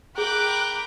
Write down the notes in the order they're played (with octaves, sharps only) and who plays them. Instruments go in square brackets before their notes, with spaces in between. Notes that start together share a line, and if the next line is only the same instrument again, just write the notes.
[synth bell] G#4 [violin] A#4 [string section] G5 B5 D6 [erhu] F#6